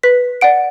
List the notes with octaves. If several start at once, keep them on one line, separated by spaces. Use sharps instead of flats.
B4 B6
D5 F#5 D7